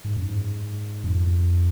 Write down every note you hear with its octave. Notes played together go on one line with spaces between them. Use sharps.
G#2
F#2
G#2
F#2
F2